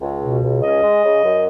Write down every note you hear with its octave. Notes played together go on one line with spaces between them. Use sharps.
C#2
B2
C#2
C#4 D#5
G#3
C#3
F#2